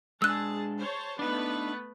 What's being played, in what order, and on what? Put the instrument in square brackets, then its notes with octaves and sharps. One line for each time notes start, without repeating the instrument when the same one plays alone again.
[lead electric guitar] G#3 D4 [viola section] G#4 A5 [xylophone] E6 F#6
[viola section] C5 C#5 A5
[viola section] A3 B3 B4 [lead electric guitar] D4 D#4